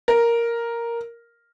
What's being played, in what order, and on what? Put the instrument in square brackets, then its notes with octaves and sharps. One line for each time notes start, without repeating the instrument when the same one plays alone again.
[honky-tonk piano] A#4